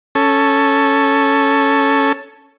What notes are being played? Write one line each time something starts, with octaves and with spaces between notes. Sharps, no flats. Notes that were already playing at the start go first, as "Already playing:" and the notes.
C#4 A4